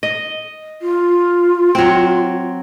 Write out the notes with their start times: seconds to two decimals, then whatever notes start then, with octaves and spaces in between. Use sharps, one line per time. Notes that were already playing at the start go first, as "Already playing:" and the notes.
0.03 D#5
0.82 F4
1.75 F#3 C4